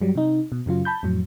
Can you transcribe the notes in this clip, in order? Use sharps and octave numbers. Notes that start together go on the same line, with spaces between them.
G2 F#3 G3
C3 D#4
B2
F#2 C#3 F#3 F4
A5 B5 G6
F2 A2 F#3